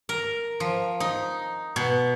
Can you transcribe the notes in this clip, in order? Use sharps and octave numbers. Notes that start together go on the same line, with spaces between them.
A#4
F3
D#4
B2